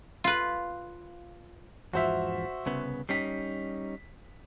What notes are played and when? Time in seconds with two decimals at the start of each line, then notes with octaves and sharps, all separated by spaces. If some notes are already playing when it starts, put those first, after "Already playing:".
0.24 F4 B4
1.93 E2 G#2 F3 F#4 C5 E5
2.66 C2 C#3 B3
3.09 G3 C#4 D#4 B6 C7